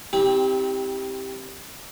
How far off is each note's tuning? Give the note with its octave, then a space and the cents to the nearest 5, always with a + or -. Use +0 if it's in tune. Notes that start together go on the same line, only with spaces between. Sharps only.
C4 +15 E4 -40 G4 +0